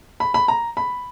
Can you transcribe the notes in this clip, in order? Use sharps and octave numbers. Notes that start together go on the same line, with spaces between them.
B5
B5
A#5
B5